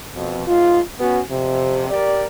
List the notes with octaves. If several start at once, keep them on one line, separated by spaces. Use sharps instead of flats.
F2 B2
G#2 F4
B3 C#4 F#4 B4 G#5
F2 C3
G4 A#4 D5